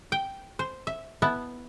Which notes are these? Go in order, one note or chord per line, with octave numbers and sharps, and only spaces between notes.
G5
C5
E5
B3 E4 E5 A5